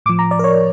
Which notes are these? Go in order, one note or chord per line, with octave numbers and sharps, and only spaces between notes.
A2 F3 D6
A#5
D5
A#4
C#5